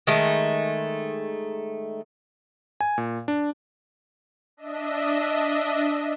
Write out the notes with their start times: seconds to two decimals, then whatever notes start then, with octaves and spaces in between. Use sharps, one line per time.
0.07 D#3 G#3 A3
2.81 G#5
2.98 A#2
3.28 D4
4.57 D4 D#5 E5